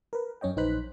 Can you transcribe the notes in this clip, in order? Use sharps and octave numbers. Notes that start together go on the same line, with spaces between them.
A#4 B4
F#2 C#4 C#5 D#5 G5
A#1 D#4 B4 C5 F#6 B6